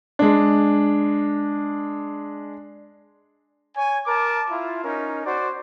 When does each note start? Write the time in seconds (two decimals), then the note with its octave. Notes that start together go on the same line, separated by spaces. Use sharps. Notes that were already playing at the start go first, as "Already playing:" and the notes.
0.19 G#3 D4
3.76 C#5 G#5
4.06 A#4 A5 D6
4.50 E4 F4
4.84 C#4 D#4 A#4
5.25 F#4 C5 D5